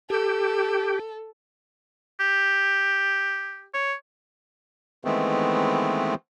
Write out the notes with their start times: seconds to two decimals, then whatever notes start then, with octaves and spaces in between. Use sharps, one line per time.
0.10 G4 A4
2.20 G4
3.74 C#5
5.05 D#3 E3 G#3 A3 B3 C4